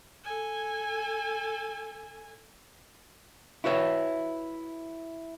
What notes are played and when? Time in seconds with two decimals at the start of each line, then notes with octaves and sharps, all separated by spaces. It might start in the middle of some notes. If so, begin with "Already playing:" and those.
0.24 A4 G#5
3.64 E4 F#4 B4 C#5 E5